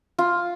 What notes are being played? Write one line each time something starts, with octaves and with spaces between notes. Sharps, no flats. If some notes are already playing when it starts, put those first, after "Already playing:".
F4